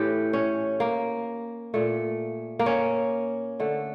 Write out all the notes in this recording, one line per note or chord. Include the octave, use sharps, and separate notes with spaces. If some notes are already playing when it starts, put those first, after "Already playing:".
Already playing: A2 E3 A3 G4
C#4
A#3
A#2 A3
A#3
C#4
D3 A3